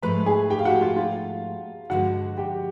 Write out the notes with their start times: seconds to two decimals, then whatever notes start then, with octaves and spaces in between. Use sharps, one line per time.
0.03 G#2 F3 A3 B4 B5
0.26 G#4 G#5
0.50 G4 G5
0.59 F5
0.65 F#4 F#5
0.81 F4 F5
0.96 F4 F5
1.90 G2 D3 F3 G#3 F#4 F#5
2.37 G4 G5